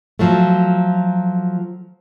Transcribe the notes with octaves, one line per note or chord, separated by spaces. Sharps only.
F3 F#3 A3